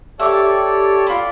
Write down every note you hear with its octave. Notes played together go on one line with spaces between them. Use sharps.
G4 A4 C#5 D5 E5 D6
F4 D5 B5